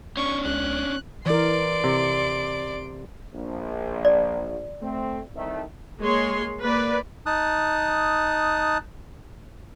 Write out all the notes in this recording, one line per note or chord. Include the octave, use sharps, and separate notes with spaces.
C#4 D4 C#6
C#2 F#6
E3 A#4 D5 C6 D7
C3
A#1
D5
A3 C4
C2 D#3 A3
G#3 A#3 G#4 C#5 C6
A#3 B4 D5
D#4 A5 D#6 F#6